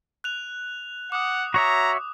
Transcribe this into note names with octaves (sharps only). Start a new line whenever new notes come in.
F#6 F7
F#5 D6 D#6
F#4 C#5 E5 A#5